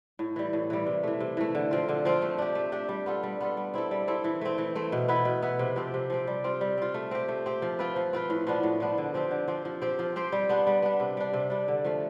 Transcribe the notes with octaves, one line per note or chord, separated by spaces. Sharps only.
A2
E3 G3
A2
E3 G3
C3
E3 A3
C3
E3 A3
D3
F3 C4 F4
D3
F3 C4 F4
A3
D4 G4
A3
D4 G4
G3
B3 F4 A4
G3
B3 F4 A4
G3
C4 E4 A4
G3
C4 E4 A4
E3
A3 C4
E3
A3 C4
B2
B3 E4 B4
B2
B3 E4 B4
C3
F3 C4 G4
C3
F3 C4 G4
G3
C4 F4
G3
C4 F4
A3
C4 G4
A3
C4 G4
F3
C4 F4 B4
F3
C4 F4 B4
A2
F3 B3 D4
A2
F3 B3 D4
D3
F3 C4 G4
D3
F3 C4 G4
F3
C4 G4 C5
F3
C4 G4 C5
G3
B3 D4
G3
B3 D4
C3
G3 D4
C3
G3 D4
D3
F3 A3